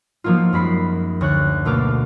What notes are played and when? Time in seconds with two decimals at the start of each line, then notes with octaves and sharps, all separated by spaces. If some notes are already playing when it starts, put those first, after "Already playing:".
0.24 F3 F#3 A#3 D#4 F4
0.53 F#2 G#3 B5 C7
1.21 D2 C#5 F#6
1.65 B2 A3 A#3 D6 F6